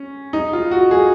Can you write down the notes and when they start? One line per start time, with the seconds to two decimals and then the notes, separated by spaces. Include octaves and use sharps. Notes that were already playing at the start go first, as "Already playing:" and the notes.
Already playing: C#4
0.33 D#4
0.53 F4
0.71 F#4
0.91 G#4